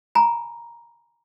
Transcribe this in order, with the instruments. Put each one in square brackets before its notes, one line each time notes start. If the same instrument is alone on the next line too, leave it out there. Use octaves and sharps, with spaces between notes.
[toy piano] G#5 A#5 B5